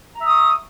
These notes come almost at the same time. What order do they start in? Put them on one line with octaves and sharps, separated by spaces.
A#5 E5 D#6 C#6